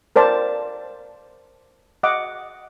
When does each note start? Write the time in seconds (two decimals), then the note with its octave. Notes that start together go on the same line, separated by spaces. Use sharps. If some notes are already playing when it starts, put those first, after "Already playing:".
0.16 A#4 C5 D5 A5
2.03 D#5 F#5 D6